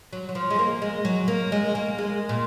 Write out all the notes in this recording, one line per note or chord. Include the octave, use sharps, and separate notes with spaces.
F#3
F#3
F3
G#3
A#3
G#3
F#3
A#3
G#3
A#3
G#3
A#2